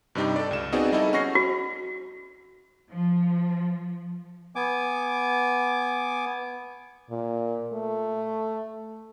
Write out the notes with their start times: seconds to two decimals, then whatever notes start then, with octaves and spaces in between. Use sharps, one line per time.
0.15 G2 C3 G3 D#4 G4
0.36 A4 D5
0.51 C#2 E7
0.72 B3 C4 D#4 F#4 G#4 D5
0.92 G3 D#4 E4 G#4 A4 D#5
1.13 C#4 F#5 C#6 A#6 C7
1.35 F#4
2.90 F3
4.56 B3 G#5 D6
7.10 A#2
7.73 A3